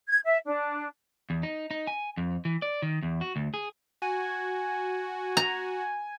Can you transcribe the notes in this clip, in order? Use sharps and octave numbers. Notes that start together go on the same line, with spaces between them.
G#6
E5
D4
E2
D#4
D#4
G#5
F2
E3
D5
D#3
E2
F#4
D2
G#4
F#4 G#5
A#5